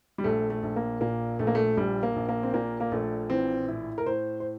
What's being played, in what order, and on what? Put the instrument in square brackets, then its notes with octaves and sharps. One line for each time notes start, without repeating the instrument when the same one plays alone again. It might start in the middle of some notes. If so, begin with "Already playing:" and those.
[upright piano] G3
A#1 A3
A3
A#1
A#3
A#2 A#3
A#1 A3
A#3
A3
A#1 G3
A#3
A#1
A#3
C4
A#2 A#3
A#3
A#1 A3
E3 C4
A2 E4
A#4
A2 C5
C5